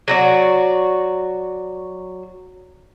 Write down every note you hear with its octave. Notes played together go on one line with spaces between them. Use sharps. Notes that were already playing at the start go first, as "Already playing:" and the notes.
F#3 F#4 D5